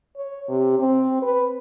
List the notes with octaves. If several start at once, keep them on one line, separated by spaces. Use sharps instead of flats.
C#5
C3
C4
B4